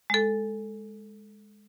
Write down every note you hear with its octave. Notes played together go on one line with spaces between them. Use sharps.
G#3 A4